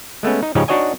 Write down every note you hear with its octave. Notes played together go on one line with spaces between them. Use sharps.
G#3 A3 B3 C#4
D#4
G#2 C#3 F3 C#4 D#4 G4
D4 D#4 F#4 C#5 D#5 G#5